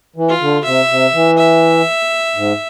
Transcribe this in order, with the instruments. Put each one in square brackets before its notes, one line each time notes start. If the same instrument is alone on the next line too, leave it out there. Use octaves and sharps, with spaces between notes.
[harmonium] E3
[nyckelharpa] F4
[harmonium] D3
[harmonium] C3 [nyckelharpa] E5
[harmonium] C3
E3
[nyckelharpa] E5
[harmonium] G#2